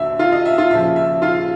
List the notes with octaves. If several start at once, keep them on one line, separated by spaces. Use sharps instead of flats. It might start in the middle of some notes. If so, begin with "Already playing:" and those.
Already playing: D#2 D3 F#3 E5
F4 F5
D#5
E5
F4 F5
D#2 C#3 F3 E5
E5
F4 F5